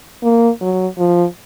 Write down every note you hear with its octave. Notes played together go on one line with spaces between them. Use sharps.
A#3
F#3
F3